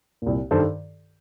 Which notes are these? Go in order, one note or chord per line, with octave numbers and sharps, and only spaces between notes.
C2 A#2
G2 D#3 A4 C5